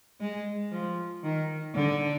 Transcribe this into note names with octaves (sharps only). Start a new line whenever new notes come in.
G#3
F3
D#3
D3